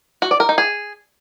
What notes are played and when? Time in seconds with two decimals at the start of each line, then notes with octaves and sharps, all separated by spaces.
0.22 F#4
0.31 D5
0.40 A#4
0.49 D#4
0.58 G#4